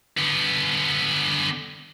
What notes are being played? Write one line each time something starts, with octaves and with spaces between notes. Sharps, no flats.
D3 B3